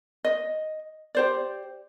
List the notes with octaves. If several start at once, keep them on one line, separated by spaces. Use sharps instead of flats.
D#5
G4 C5 D5